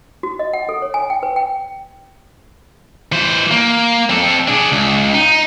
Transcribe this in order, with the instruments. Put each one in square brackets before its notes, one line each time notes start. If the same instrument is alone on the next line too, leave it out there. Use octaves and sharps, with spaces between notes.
[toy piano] F#4
D#5
F#5
A4
C#5
G#5
G5
B4
G5
[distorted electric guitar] E3 C5
A#3
C4 A4
D4 G#4
C#2
D#4